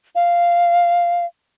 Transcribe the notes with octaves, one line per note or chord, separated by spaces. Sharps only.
F5